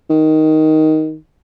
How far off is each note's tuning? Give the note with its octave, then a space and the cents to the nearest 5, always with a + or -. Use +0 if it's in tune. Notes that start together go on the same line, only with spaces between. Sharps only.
D#3 +5